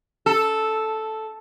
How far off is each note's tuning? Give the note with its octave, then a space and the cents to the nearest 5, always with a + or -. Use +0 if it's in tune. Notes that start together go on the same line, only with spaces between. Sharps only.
A4 -5